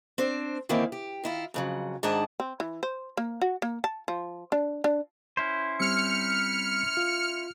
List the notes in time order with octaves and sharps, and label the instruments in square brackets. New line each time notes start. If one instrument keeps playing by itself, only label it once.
[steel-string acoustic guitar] C4 D4 C5
D#3 E3 A#3 C4 E4
G4
D#3 E4 F4
F2 C#3 F#3
G#2 D#3 D4 G#4 F#5 A5
[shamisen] C4
E3
C5
A#3
F#4
A#3
A5
F3
D4
D4
[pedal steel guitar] C#4 E4 C5
[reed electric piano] G3 C4 E6 [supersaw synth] F6 C#7
[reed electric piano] F4